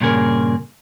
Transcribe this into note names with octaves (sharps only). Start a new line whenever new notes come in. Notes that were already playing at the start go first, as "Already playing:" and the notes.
G2 A#2 C#3 G#4 A#4